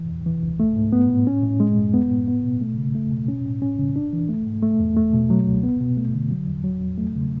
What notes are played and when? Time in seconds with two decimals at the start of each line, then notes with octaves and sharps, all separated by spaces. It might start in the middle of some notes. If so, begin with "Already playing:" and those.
Already playing: E3
0.09 E2
0.26 E3
0.43 C#2
0.60 A3
0.76 G#2
0.93 B3
1.09 A2
1.27 C#4
1.43 A2
1.60 G#3
1.77 F#2
1.94 B3
2.11 A2
2.28 B3
2.44 B2
2.61 A3
2.78 C#3
2.95 A3
3.12 B2
3.28 C#4
3.45 A2
3.62 C#4
3.78 C#3
3.96 D4
4.13 E3
4.29 A3
4.46 G#2
4.62 A3
4.80 E2
4.97 A3
5.13 B2
5.30 F#3
5.47 C#2
5.63 B3
5.81 B2
5.97 A3
6.14 D3
6.31 F#3
6.48 E2
6.64 F#3
6.81 E2
6.98 A3
7.15 C#3